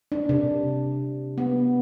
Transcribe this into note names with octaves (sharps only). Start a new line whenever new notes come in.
D4
C3
B3